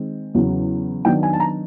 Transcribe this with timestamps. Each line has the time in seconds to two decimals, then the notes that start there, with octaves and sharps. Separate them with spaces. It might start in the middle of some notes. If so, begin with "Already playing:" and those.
Already playing: D#3 G#3 C4
0.35 E2 C#3 F#3
1.05 D#3 F#3 B3 D4 G5
1.23 G#5
1.33 A5
1.40 A#5